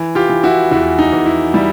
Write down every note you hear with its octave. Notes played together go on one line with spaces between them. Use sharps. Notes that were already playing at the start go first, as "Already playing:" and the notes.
Already playing: E3
F4 G4
E3
E4 F#4
E2 E4
D#4
E2
E4
G3 E4